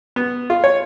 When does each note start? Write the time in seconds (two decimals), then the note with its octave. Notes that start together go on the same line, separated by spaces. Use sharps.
0.16 B3
0.50 F4
0.64 C#5